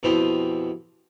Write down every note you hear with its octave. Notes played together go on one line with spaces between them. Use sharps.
F2 B2 E3 C4 G4